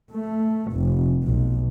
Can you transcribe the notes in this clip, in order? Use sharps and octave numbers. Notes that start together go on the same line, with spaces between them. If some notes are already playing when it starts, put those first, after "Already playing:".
A3
F1
B1